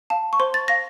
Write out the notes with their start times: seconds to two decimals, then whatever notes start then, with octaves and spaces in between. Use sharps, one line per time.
0.10 F5 A5
0.33 C#6
0.40 C5 C6
0.54 A6
0.68 F5 A#6